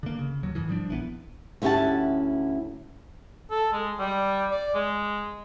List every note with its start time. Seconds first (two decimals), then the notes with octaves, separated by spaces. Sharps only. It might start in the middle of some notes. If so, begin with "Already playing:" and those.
0.03 D3 A#3
0.19 C#3
0.43 D1 D#2 F#3
0.55 G#2 D#3 E3
0.69 F3 G3 D4
0.89 A#1 E3 G3 B3
1.62 D2 C#4 E4 G4 F#5 A5
3.51 A4
3.73 G#3
3.99 G3
4.51 D5
4.74 G#3